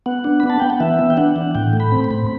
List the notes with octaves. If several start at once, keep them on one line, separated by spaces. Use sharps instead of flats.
B3 F#5
D4
B3 B5
A5
B3 G5
F#5
E3 E5
B3
G5
D4 F#5
E3
A2 G5
A3
B5
C4
B5
A2